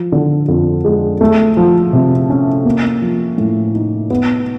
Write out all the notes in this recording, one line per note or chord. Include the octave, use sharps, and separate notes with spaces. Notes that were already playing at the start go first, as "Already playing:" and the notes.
Already playing: F3
D3
F2
G#3
A3
F3
C3
C#4
A#3
F3
A2
D#4
B3